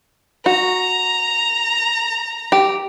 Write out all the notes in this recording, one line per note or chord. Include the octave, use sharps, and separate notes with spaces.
F#4 A#5
G4